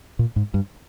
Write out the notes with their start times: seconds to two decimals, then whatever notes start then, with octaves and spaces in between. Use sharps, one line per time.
0.19 A#2
0.36 G#2
0.54 G2